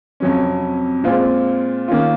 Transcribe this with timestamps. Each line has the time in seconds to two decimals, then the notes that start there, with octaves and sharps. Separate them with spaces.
0.20 F2 C3 F#3 C#4
1.04 A#2 G#3 C4 F4
1.88 D#3 A#3 C#4 F4